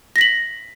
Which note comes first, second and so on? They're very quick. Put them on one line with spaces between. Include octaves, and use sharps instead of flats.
A#6 B6 F#7